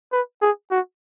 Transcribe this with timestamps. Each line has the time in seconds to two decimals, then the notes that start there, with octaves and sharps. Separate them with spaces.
0.12 B4
0.42 G#4
0.71 F#4